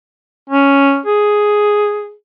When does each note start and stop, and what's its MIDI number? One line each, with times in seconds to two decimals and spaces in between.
0.50 0.99 61
1.06 2.13 68